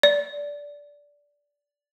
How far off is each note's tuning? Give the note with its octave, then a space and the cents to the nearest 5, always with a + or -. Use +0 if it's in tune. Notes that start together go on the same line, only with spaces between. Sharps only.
D5 -15